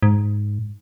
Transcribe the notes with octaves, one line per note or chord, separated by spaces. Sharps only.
G#2